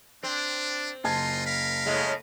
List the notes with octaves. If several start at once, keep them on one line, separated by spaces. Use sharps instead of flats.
C4 D4
F#1 D#4 F4 A5 C6 G#6
A#4 F5 B5
A2 C#3 G#3